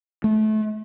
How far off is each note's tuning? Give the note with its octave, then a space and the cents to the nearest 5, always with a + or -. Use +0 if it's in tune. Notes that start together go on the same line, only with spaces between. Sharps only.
A3 -30